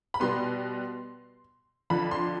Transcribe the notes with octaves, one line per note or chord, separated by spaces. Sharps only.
B5
B2 G3 B3 C6
F2 D3 F3 B5
C6